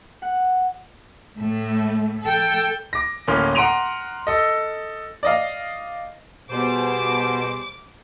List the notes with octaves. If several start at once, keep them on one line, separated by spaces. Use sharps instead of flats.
F#5
A2 A3
A4 G5
D6 A#6
D1 A2 A#3 C#4 C6 F6
F#5 A#5 C6 D7 D#7 F7
A4 D#5
D5 D#5 F5
B2 G3 G#4 C5 D6